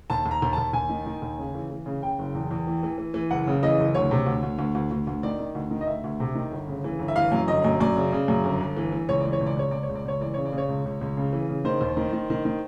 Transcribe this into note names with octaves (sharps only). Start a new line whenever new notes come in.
D#2 A5
D#2
A#5
D#2
D#2 A5
D#2 G#5
D#3
D#3
D#2
C#3
E3
E3
C#3
C#3 G5
F#1
E2
E2
E3
E3
E3
E3
F#1 F#5
C#3
E3 D#5
F#1
D2 C#5
C3
D2
D2
D2
D2
D2
D2
D#3 D5
D#3
D2
D#3
D#5
D2 E5
D2
C3
D#3
G1
C#3
E3
G1
E5
E3 F5
F#2
G1 D#5
F#2
F#2 D5
C#3
C#3
F#2
G1
G1
E3
E3
C#2 C#5
E3 D5
C#5
C#2
D5
C#2 C#5
C#2 D5
C#5
C#2
D5
C#2 C#5
E3 D5
C#3 C#5
D5
C#3
C#5
C#2
C#2
C#2
C#3
E3
C#3
D#3 C5
D#2
D#3
D#3
D#3
D#3